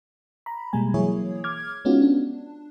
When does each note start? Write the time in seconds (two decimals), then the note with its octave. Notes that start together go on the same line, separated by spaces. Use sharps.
0.46 A#5 B5
0.73 B2 G3 G#3 A#3 G#5
0.94 E3 F#3 A#3 E4 G#4 C#5
1.44 D6 F6 G#6
1.85 G#3 B3 C#4 D#4 F4 F#4
2.02 D4